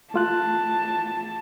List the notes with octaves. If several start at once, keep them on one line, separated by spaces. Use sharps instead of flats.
A3 F4 A5 F#6